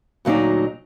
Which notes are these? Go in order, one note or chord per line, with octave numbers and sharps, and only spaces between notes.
D2 A#2 F#3 D4 D#4